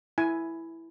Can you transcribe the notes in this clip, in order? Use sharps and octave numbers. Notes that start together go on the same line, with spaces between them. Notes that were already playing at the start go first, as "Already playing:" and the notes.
E4 G#5